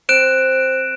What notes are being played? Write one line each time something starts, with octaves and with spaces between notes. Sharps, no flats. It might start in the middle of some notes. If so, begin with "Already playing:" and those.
C4 F#6 D7 E7